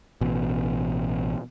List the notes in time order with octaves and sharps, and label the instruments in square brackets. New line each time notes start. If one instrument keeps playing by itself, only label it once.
[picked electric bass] A1 B2